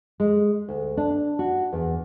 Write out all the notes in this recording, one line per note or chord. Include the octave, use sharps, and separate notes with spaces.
G#3
D2
D4
F#4
E2